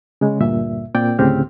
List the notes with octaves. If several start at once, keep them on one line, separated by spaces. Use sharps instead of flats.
C#3 G#3
D2 G2 A#2 E5
A#2 C4 D5 G5
D2 A2 C#3 C4 G4 F6